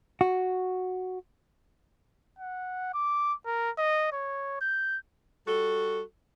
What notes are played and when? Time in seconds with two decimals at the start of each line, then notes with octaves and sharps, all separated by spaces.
0.21 F#4
2.39 F#5
2.94 D6
3.46 A#4
3.78 D#5
4.13 C#5
4.61 G6
5.47 G3 F#4 A4